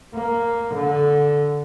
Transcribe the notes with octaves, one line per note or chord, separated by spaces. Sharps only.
A#3
D3